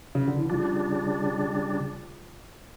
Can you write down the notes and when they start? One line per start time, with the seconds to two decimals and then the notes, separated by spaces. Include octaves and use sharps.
0.15 C#3
0.28 D3
0.38 E3
0.50 C#3 F3 G3 D4